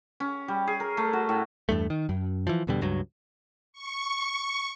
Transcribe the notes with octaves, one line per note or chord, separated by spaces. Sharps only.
C#4
G3
G#4
A#4
A3
F#4
A2
E2 G2 A3
D#3
F#2
E3 F3
E2 B2 D3 G3
C#2 G2 F#3
C#6